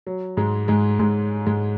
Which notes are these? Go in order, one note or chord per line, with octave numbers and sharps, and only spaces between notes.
F#3
G#2 G#3
G#2 G#3
G#2 G#3
G#2 G#3